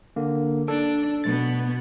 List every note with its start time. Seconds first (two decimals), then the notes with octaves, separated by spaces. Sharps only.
0.16 D3 A#3
0.68 D4 A4
1.24 B2 B3 A6